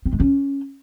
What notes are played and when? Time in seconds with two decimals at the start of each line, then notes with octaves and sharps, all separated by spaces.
0.06 C4
0.13 G#3
0.20 C#4